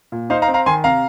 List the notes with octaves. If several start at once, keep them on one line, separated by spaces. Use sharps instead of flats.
A#2
D#4 C5 F5
F5 A#5
C4
F5 A#5
D#3 G#5 C6
C3 F5 A#5